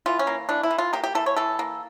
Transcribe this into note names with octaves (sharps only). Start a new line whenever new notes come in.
E3 F4
C#4
A#3
E3 D4
E4
E3
F4
A#3 G4
G4
E3 A4
C#5
E3 A4
A#3